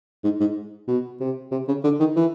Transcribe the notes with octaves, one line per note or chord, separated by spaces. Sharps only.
G#2
G#2
B2
C3
C3
C#3
D3
D#3
E3